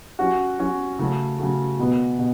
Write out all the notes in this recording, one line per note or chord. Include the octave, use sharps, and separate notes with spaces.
F#3 C#4 F#4
F#3 C#4 F#4
C#3 F#3 A3
C#3 F#3 A3
B2 F#3 B3
B2